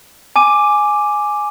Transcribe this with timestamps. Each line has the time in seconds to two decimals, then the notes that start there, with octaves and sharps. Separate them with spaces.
0.36 G#5 D6 D#7